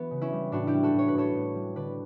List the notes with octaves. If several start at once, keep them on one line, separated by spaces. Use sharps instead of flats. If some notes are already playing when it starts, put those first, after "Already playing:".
Already playing: E3 B3 F#4
C#3
C#4 E4
G3
A2 D4 F#4
E4 G4
G3
F#4 A4
A2
C#5
B4
A2 A4 C#5
A2
G3
D3 B4 D5